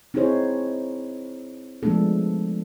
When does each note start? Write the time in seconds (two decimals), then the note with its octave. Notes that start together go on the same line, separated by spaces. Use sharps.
0.14 C4 D#4 E4 G#4 C5 C#5
1.83 F3 G#3 A3 B3 D4 A4